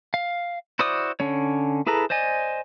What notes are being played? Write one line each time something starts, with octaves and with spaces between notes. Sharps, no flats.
F5
E4 F#4 C5 D5 D#6
D3 C#4 C#5
E4 G#4 A4 B4 A#5
C5 D5 D#5 G#5